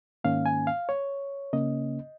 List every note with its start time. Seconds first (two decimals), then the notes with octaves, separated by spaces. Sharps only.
0.24 G#2 D#3 A#3 C#4 F5
0.46 G#5
0.67 F5
0.89 C#5
1.53 C#3 A#3 C#4 D#5